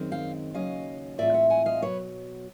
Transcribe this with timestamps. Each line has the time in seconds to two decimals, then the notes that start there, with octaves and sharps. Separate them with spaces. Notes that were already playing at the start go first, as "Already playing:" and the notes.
Already playing: F#2 D#3 G#3 C4
0.12 F5 G5
0.54 D#2 C#3 F#3 C#4 D#5 F5
1.18 A2 E3 G#3 C4 F4 D5 E5
1.34 E5 F#5
1.50 F#5 G#5
1.66 D#5 F5
1.82 B2 F#3 B4 C#5